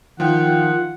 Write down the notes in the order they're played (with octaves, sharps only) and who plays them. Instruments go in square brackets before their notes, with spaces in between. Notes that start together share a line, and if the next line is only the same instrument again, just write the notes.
[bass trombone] D#3 [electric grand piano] F3 G5 [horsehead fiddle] F4 [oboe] F#5